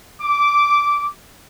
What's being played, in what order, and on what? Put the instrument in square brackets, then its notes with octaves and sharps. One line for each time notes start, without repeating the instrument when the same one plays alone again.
[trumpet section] D6